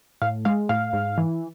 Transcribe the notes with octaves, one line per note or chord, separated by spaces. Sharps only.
A2 F5
G#3 F5
A2 F5
G#2
E3